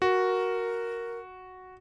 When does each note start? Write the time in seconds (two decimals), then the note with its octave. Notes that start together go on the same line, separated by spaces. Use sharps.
0.02 F#4 A#4